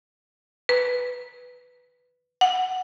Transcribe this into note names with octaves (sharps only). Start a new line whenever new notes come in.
B4
F#5